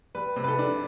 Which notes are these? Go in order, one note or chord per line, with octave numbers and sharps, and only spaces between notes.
G3 B4
C3
B4
A4
D4